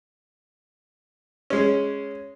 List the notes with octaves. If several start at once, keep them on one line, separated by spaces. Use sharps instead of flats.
G#3 C#4